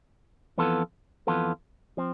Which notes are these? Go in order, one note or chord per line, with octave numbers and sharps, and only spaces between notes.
F2 E3 B3 F4 A4
F2 E3 B3 F4 A4
F3 C4